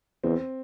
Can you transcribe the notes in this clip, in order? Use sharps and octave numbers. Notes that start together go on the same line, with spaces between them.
E2 C4